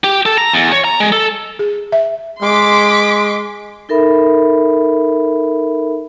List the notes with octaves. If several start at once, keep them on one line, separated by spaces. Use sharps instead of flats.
G4
A4
A#5
E2
C#5
A#5
G#3
A4
G#4
E5
G#3 C6 D6 B6
D#4 A4 A#4 E5 B5